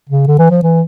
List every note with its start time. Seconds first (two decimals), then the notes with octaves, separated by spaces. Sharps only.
0.10 C#3
0.27 D3
0.39 E3
0.50 F3
0.63 E3